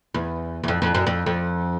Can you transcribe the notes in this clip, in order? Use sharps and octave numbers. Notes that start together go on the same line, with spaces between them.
E2
E2
F2
F2
F#2
F2
F2